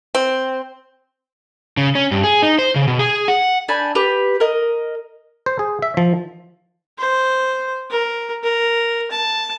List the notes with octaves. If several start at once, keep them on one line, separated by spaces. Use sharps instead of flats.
C4
C#3
C#4
G2
G#4
D#4
C5
C#3
B2
G#4
F#5
D4 G#5 B5 G6
G4 B4
A#4 D#5
C5
G#4
E5
F3
C5
A#4
A#4
A5